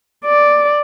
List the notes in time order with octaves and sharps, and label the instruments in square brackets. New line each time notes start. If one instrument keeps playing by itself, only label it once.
[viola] D5